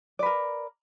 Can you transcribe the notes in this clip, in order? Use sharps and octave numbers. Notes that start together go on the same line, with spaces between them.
A#4 B4 D5